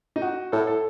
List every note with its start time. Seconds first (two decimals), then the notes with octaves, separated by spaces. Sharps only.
0.16 D#4
0.22 F#4
0.52 A2 A4
0.67 A4